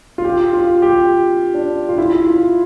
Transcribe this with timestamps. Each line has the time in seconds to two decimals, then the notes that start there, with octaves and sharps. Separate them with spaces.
0.18 F4
0.25 G4
0.53 F4
0.82 G4
1.54 D4
1.89 F4
1.98 E4
2.26 F4